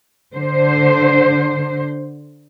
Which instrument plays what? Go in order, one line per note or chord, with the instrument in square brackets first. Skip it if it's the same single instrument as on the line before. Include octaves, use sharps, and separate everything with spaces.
[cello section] D3 C5